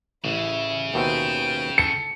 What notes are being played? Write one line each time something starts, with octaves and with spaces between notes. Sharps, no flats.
A1 C#3 E4
D#2 B2 C4 G5
A4 C#7